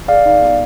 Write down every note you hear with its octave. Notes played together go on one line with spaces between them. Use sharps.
G#4 D5 F5
D#4
B3